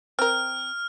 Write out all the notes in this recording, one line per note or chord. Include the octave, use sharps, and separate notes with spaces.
C4 A#4 F6